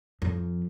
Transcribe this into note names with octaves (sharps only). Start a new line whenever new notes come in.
F2